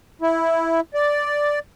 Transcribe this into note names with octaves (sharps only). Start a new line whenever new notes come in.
E4
D5